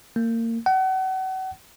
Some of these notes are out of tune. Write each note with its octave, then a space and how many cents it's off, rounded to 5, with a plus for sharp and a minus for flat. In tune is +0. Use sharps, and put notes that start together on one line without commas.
A#3 -30
F#5 +35